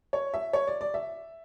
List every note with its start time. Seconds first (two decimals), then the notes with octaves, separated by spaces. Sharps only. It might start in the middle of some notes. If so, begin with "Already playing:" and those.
0.13 C#5
0.34 E5
0.53 C#5
0.67 D5
0.81 D5
0.94 E5